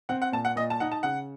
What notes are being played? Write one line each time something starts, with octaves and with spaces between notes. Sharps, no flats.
C4 F#5
F#5
A#2 A5
F#5
A#2 D#5
A5
D#4 F#5
A5
C#3 F#5